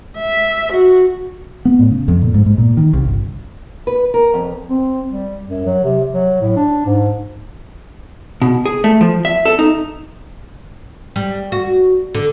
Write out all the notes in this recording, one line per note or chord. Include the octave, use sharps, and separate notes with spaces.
E5
F#4
B3
A2
C#3
F2
A#2
G#2
G#2
A#2
D#3
C2
G1
B4
A#4
F2
C4
G3
F#2
F#3
C3
F#3
A2
D4
G#2
B2
G#4
A3
F3
E5
A4
D#4
G3
F#4
D3